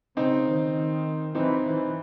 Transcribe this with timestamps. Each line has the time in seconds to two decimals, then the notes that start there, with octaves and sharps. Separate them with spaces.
0.17 C#3 C4 D#4
0.46 D#3
1.35 E3 C4 D#4
1.65 E3